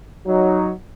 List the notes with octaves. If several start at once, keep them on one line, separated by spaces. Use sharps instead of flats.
F#3 D#4